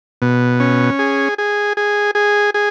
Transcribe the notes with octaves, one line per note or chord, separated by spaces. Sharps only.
B2
C#4
G#4
G#4
G#4
G#4
G#4